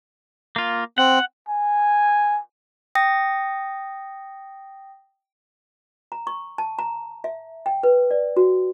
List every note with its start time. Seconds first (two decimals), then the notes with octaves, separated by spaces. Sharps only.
0.56 A#3 F4
0.98 C4 F#5
1.49 G#5
2.95 G5 D#6 A#6
6.12 A#5
6.27 C#6
6.58 A5
6.79 A#5
7.24 E5
7.66 G5
7.83 B4
8.11 D5
8.37 F#4